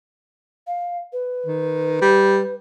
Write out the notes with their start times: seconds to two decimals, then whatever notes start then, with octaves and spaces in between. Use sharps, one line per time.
0.67 F5
1.13 B4
1.46 D#3
2.02 G3